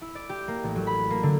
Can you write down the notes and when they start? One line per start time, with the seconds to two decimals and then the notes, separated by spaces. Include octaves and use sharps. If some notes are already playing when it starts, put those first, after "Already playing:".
0.01 E4
0.15 D5
0.29 G4
0.48 A#3
0.63 A1
0.76 F#3
0.87 B5
1.10 A#3
1.23 D3